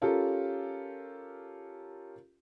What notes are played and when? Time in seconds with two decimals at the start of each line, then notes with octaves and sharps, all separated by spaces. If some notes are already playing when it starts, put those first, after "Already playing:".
0.02 C#4 F4 G4 A4 A#4